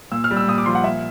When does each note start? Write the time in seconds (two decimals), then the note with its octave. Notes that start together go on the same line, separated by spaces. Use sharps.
0.12 A#2 E6
0.24 F6
0.31 G3
0.37 E6
0.48 A#2 D#6
0.58 D6
0.66 F3 C6
0.75 F#5
0.84 A#2 E5